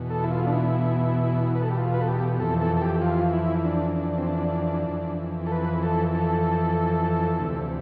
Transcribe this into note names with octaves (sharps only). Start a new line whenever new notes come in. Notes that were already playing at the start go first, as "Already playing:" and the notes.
Already playing: E2 B2
A4
E4
F4
D4
E4
B4
A4
G4
F4
B4
A4
G4
F2 E3 A4
A4
A4
G4
F4
E4
D4
D4
C4
D4
F2 E3
A4
B4
A4
A4
D2 C3 E3